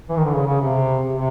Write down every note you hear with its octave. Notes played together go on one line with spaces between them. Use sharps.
E3
D#3
D3
C#3
C#3
C3
C3